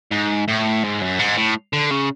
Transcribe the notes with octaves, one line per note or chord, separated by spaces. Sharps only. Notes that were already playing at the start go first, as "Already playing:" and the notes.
G#2
A2
G#2
F#2
G#2
A2
D3
C#3